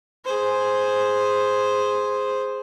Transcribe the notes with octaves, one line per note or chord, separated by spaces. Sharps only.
G#4 C5